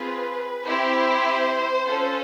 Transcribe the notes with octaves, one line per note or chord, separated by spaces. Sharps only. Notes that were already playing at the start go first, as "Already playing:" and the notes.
Already playing: C4 F4 G#4 B4
C4 E4 G4 C5
C#4 F4 A4